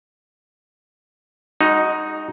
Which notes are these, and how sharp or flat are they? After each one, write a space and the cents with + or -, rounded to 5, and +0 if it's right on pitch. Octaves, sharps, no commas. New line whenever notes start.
G#3 -25 D#4 +0 F#4 +0